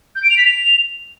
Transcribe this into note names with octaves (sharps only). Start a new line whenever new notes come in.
G6
D7
F7
B6
F7